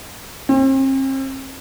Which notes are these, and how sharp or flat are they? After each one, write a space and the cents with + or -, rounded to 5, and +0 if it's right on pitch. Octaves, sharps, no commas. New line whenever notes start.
C4 +40